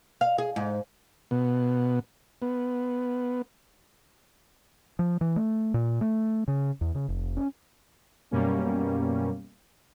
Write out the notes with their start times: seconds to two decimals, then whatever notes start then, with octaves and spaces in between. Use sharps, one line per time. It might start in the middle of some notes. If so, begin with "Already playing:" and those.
0.21 F5
0.38 G#4
0.56 G#2
1.31 B2
2.42 B3
4.99 F3
5.21 E3
5.36 A3
5.74 A#2
6.01 A3
6.48 C#3
6.81 E2
6.95 C#3
7.09 F1
7.37 C#4
8.31 F#2 B2 G3 A#3 C#4